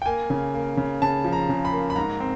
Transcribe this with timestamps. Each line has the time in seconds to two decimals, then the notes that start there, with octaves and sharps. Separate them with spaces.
0.02 G5
0.06 A#3 G#5
0.30 C#3
0.54 A#3
0.77 C#3
1.02 C#3 A5
1.24 F3
1.33 A#5
1.49 C#3
1.65 B5
1.72 A#3
1.90 B5
1.96 G#2 A#5
2.20 C4